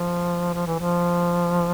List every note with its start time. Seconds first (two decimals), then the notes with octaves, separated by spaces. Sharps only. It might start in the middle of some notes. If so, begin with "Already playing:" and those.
Already playing: F3
0.54 F3
0.67 E3
0.79 F3